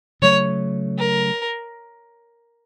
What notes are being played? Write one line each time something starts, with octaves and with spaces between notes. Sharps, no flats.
C#3 F#3 A3 C#5
A#4